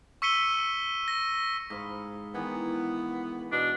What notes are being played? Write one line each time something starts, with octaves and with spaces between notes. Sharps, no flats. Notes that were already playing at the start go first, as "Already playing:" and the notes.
C#6 E6 B6 C#7 D#7 G7
A#6
G#2 F5 B5
D#3 E3 B3
B2 D4